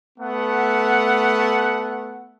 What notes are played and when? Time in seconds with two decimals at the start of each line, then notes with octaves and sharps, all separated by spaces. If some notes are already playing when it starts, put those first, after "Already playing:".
0.19 A3 B3 F#5